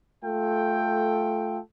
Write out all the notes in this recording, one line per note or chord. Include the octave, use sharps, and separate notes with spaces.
A3 F4 A4 G5